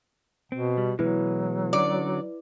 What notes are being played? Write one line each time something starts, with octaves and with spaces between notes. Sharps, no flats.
B2 C4
G3
B2 E3 F#3 G#3 E4 B4
D3 C#4 F#4 D5